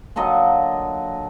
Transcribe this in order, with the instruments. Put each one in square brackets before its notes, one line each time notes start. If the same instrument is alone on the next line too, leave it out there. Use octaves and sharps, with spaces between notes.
[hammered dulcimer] A#2 D3 F#3 D#5